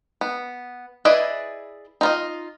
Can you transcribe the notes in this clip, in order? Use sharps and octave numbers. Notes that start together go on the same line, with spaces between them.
B3
E4 G#4 B4 D5 D#5
D#4 F4 D#5